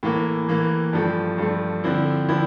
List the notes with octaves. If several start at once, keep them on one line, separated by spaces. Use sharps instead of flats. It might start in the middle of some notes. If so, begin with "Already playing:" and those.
A2 E3 A#3
A2 E3 A#3
G2 F3 A3
G2 F3 A3
D3 F3 C4 E4
D3 F3 C4 E4